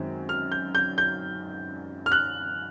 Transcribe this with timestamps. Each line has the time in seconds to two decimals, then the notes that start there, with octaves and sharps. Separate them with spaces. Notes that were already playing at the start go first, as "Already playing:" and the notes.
Already playing: F#2 D#3 G#3 C4
0.29 F6
0.52 G6
0.75 G6
0.98 G6
2.06 F6
2.12 F#6